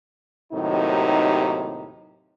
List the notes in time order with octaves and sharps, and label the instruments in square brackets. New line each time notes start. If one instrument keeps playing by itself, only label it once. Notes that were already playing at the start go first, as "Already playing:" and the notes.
[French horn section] D#2 A2 C3 D#3 F#3 D#4